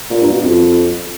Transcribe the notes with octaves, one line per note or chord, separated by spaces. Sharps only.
A#2
G2
B2
F2